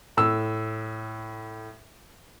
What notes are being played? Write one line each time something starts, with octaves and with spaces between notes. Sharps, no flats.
A2 E6